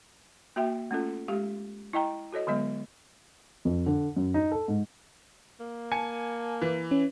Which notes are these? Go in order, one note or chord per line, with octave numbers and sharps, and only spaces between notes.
A#3 F#4 E5 G5
A3 C#4 F4 A4
G#3 G4 F5
E4 D#5 G5 A#5
F#4 A4 C#5 D#5
D3 F#3 G#3 B3 D#5
F2
D3
F#2
D#4
A4
G#2
A#3
G#5 A5 C#7
E3
C#4